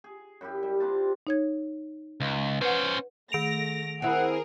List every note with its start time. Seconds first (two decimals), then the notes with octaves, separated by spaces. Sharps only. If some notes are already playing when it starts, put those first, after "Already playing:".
0.04 G#4
0.41 F#2 E4 G4
0.63 G3
0.80 C3 D4 F4 A5
1.27 D#4 C#5 G#6
2.20 C#2
2.61 C#4 B4 C5 F#5
3.32 D#3 A3 A#6 D7 F7
4.02 C4 E4 G#4 A#4 F#5